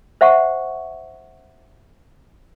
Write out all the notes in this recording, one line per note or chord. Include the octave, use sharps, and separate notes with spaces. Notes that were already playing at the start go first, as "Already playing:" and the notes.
C5 E5 F#5 C#6